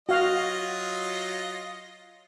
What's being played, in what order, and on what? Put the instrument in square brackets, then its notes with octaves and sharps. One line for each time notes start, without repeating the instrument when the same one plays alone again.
[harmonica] F#3 F4 D#5 [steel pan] F#4 F5